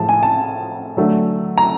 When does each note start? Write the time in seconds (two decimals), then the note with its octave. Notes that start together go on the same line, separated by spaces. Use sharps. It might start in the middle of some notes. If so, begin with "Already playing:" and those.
Already playing: A2 F3 G#3 A5
0.09 G#5
0.23 A5
0.97 D3 F#3 A3
1.58 A#5